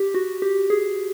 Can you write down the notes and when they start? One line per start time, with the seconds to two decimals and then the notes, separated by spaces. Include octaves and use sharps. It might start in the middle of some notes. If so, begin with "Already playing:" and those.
Already playing: G4
0.14 F#4
0.42 G4
0.70 G#4